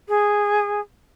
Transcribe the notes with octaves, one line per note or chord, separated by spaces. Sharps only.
G#4